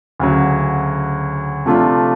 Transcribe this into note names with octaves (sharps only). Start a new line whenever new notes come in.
D2 C#3 F#3
C3 F3 A3 D4 F4